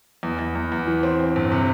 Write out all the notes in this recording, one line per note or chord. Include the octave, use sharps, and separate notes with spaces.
E2
E2
E2
E2
E3
C4
C4
G1
C3